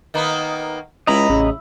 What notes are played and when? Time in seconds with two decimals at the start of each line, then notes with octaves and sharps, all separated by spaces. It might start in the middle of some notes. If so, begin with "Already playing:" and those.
0.14 D#3 A#3 B3
1.07 C#2 E4 D#5 A#5 B5
1.29 A1 C#3